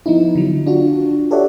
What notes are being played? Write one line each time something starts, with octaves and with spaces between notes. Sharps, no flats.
F3 B3 D#4 E4
D3 F#3
D4 F4 F#4
G4 A4 C#5 D5 E5 F#5